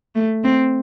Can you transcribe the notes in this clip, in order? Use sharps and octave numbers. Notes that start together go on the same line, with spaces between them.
A3
C4